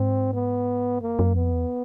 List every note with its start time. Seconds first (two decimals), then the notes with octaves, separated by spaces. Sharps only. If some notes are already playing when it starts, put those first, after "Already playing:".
Already playing: G#2 C4
0.33 B3
1.01 F#2 A#3
1.19 F#2
1.36 F2 B3
1.52 E2